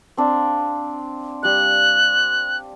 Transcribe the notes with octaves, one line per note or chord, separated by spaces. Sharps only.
C4 D4 F5
G3 F5 F#6